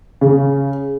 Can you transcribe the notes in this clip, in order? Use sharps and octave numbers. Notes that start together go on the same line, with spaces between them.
C#3